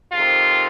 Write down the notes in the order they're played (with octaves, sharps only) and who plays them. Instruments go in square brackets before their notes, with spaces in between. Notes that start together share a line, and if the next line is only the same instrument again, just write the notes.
[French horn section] F2 C3 D#3 F4